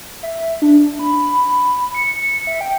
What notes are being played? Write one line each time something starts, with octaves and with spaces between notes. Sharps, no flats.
E5
D4
B5
C#7
E5
G5